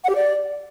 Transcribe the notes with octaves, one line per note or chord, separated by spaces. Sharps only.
F#5
G4
D5